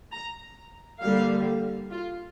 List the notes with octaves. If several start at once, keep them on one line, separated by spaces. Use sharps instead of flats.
A#5
D3 G3 A#3 F5
F4